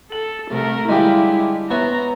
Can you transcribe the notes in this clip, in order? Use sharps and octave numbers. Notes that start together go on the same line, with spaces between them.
A4 F#7
C2 A3 A#4
D3 G3 G#3 E4 F4 G4
B3 E4 C5 C#5 A#5